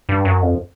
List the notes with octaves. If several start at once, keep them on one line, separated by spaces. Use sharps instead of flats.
G2
F#2
F2